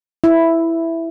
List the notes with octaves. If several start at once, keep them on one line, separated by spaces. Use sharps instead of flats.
E4